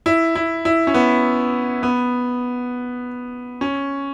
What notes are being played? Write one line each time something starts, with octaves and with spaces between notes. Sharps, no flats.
E4
E4
E4
C#4
B3
B3
C#4